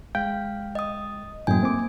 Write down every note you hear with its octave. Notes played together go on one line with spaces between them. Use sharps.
G#3 F5 G5
D#5 D#6
F#2 A2 A#3 G5 G#5
C4 D6